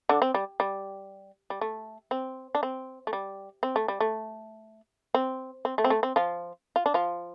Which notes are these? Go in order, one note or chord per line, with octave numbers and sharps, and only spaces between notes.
D3 D4
C4
G3
G3
G3
A3
C4
D4
C4
A3
G3
C4
A3
G3
A3
C4
C4
A3
C4
A3
C4
F3 F4
F4
D4
F3 F4